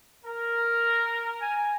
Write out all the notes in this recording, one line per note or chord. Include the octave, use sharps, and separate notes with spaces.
A#4
G#5